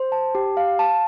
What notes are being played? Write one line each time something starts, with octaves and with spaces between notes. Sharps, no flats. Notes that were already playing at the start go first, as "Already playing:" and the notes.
Already playing: C5
A5
G4
F5
A5